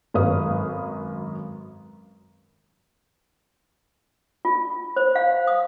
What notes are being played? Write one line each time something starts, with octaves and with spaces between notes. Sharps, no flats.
G#1 F#2 A4 B4 F5 D#6
F4
C5
F5
D#6